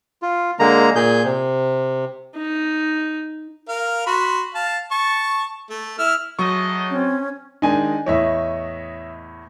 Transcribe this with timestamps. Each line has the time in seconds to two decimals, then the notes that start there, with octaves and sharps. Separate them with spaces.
0.22 F4
0.59 D3 G#3 A#3 A#5
0.96 A#2 G#4 G6
1.24 C3
2.35 D#4
3.69 A#4 F5
4.07 F#4 B5 C6
4.55 F5 A5
4.92 A5 C#6
5.70 A3
5.99 E4 E6 F6
6.39 F#3 G#3 A3 D#5 C#6
6.90 C4 C#4
7.62 D#3 G#3 D4 D#4 G#5
8.06 E2 A2 C#5 D#5 E5